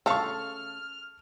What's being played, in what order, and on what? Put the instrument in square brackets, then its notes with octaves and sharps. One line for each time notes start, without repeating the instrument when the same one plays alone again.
[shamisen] C#3 A3 A#5 [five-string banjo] A4 F5 [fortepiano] A5 C#6 [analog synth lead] F6